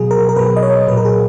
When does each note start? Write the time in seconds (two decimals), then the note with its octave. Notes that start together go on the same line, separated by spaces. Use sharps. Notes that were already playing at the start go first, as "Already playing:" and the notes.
Already playing: B2 F#3 G#4
0.11 A#4
0.29 A#4
0.36 B2 F#3 B4
0.56 D#5
0.63 C#5
0.88 A#2 F#3 B4
0.97 A#4
1.05 G#4